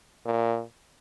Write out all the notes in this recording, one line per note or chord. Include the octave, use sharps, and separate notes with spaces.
A#2